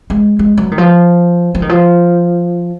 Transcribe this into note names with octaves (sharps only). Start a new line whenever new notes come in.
G#3
G#3
F#3
D#3
F3
F3
D#3
F3